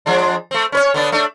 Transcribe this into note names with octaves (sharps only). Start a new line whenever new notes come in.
F3 G#3 D4
A3 C4
C#4 B4 C#5
D3 B3 D4
A3 D4